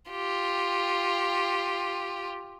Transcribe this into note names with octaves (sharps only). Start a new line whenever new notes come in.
F4 G4